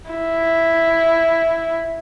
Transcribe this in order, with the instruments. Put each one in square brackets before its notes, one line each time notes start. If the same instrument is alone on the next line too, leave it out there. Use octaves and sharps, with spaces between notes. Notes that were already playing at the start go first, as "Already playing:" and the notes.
[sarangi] E4